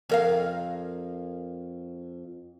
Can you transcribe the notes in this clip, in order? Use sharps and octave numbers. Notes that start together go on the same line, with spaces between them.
F2 A#4 F5